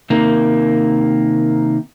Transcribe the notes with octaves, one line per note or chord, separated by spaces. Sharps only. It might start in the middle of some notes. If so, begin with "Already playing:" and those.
C3 D#3 A#3